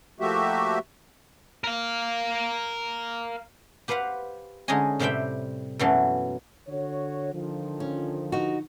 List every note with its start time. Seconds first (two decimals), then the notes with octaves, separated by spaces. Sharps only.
0.20 F3 A3 A#3 F#4 G4 E5
1.64 A#4 F5
3.88 G4 B4 C5 F5 F#5
4.68 D3 G#3 C#4 D#4 D#5 G#5
4.99 A2 C3 G3 C4 E5 G5
5.79 F#2 B2 E3 F#3 A3
6.67 D3 F#4 C#5
7.34 D3 D#3 F3
7.80 C#4
8.32 D#4 F#4